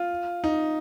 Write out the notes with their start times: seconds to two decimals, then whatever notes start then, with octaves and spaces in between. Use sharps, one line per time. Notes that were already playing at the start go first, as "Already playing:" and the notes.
Already playing: F4
0.44 D#4